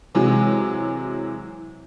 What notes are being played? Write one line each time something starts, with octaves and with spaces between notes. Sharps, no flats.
C3 E3 F#3 G#3